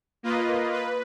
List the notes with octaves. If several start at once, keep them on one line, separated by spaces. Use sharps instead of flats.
A#3 F4 B4 D#5
B4